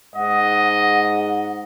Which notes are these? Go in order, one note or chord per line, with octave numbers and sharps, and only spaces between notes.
G#2 D#5 F#5